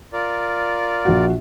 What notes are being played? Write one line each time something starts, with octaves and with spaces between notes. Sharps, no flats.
F4 A#4 D5
A#1 F#4